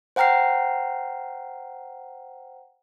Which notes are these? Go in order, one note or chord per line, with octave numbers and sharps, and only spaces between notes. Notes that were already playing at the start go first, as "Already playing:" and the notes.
C5 F#5 G5 A#5 F6 C7